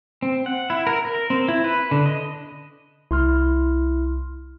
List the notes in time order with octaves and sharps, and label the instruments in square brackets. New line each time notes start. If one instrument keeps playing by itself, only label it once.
[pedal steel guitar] C4
F#5
E4
A#4
A#4
C4
E4
B4
D3
D#5
[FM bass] C2 [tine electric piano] E4 C6 F6